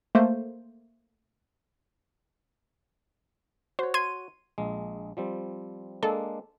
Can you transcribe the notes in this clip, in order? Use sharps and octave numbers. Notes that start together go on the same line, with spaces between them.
A3 A#3 C5
F#4 C5 C#5
C6 G#6 D#7
A#1 G#3
F3 G3 C4
G#3 A#3 D4 A4